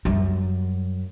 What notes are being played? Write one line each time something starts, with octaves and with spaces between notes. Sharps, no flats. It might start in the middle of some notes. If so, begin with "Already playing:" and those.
F#2 G3